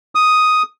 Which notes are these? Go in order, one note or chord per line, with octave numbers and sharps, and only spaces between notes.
D#6